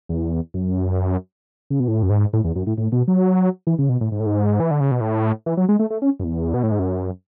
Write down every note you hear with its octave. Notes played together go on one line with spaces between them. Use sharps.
E2
F#2
C#3
B2
A2
F#2
G#2
A2
E2
F#2
A2
A2
B2
F#3
E3
C#3
B2
A2
G#2
A2
G#2
E3
D3
C#3
B2
A2
E3
F#3
G#3
A3
A3
C#4
F#2
E2
B2
A2
G#2
F#2